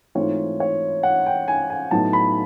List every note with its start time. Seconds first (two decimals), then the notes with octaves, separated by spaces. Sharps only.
0.15 G#2 E3 A3 C4 F4 C#5
0.60 C#5
1.03 F#5
1.26 G5
1.48 G#5
1.70 G#5
1.91 A2 F#3 B3 D#4 A5
2.13 B5